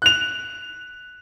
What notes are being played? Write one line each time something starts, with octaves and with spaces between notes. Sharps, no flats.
F#6 F7